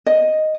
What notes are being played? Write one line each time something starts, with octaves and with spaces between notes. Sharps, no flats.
D#5